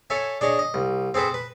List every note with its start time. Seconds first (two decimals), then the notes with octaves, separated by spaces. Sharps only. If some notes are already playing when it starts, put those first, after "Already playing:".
0.10 A4 C#5 E5 G#5
0.41 D4 G#4 C#5 D#5
0.59 D#5
0.74 C2
1.14 C4 G#4 A4 B4 C5
1.34 B4